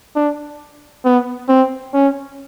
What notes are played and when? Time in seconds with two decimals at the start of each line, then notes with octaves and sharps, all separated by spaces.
0.15 D4
1.05 B3
1.49 C4
1.94 C#4